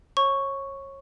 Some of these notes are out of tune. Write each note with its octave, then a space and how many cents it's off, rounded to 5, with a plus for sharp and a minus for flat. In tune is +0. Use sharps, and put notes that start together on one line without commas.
C#5 -30 C#6 +0